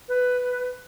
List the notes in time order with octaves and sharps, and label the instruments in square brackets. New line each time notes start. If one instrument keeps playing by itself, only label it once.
[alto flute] B4